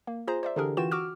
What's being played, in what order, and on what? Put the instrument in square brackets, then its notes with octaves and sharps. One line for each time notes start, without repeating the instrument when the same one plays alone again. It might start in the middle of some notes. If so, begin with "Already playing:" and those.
[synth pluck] A#3
F4 G#4 C5 A#5
C5 D5 E5
D3 E3 D4 G4 G#4 A#4
E3 F4 F#4 G5 E7
F#4 D6 E6 F6